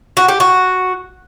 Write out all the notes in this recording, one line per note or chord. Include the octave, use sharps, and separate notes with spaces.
F#4
G4
F#4